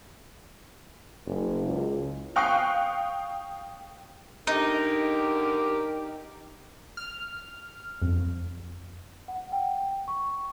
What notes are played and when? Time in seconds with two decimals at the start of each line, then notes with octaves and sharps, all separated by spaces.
1.26 F#1
1.67 C#2
2.36 F5 G5 C#6 D#6 F#6 C7
4.47 D3 D#4 G4 A#4
6.97 F6
8.02 F2
9.28 F#5
9.52 G5
10.08 C#6